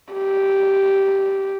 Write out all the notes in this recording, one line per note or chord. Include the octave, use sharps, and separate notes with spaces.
G4